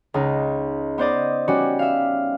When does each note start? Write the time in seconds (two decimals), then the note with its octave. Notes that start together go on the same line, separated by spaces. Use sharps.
0.14 C#2 D#4
0.98 B3 C5 D5 D#5
1.48 G3 C#4 F#4
1.79 E5 F5